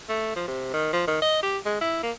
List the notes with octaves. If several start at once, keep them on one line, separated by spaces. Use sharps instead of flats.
A3
F3
C3
D#3
F3
D#3
D#5
G4
G#3
E4
A#3